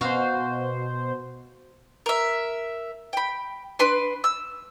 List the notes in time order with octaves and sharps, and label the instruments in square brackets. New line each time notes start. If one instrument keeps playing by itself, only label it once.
[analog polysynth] B2 C5 [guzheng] F#4 F5
[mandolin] A#4 E5
G5 B5
D4 B4 C6
E6